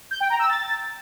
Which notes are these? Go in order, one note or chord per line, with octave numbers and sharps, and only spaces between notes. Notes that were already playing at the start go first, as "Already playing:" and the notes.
G6
G5
A#5
E6
A6